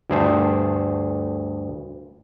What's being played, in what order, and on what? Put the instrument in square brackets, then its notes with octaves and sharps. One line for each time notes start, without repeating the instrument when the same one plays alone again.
[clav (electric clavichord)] D2 G2 A3 G#4 C5